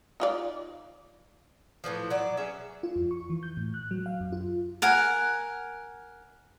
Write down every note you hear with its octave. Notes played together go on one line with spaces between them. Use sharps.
D#4 F4 D5
A2 D3 E3 F3
F#3 D5
C#4 G#4 E5
F4
F2
C#6
E3
G6
A2
F#6
F#3
F5
F#2
F4
A#4 F#5 G#5